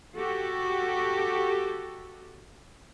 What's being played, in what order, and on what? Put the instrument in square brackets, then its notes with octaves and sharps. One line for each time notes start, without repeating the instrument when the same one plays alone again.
[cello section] F#4 G4 A4